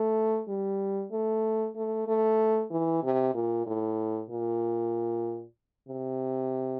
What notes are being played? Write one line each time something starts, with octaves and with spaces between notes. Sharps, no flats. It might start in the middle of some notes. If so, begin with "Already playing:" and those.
Already playing: A3
G3
A3
A3
A3
E3
C3
A#2
A2
A#2
C3